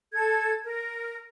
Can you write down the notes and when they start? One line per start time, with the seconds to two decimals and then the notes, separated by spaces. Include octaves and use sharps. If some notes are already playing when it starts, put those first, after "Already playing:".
0.13 A4 G#6
0.64 A#4